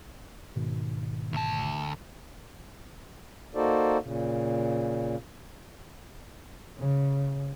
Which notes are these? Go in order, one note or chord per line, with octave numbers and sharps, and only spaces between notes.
G#2 B2 D#3
D2 A5
A#3 D#4 F#4 A4 C5 D5
A#2 C#3
C#3